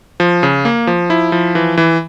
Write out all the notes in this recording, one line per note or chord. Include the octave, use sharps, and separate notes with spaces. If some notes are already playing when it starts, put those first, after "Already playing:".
F3
C#3
A#3
F3
E4
F3
E3
E3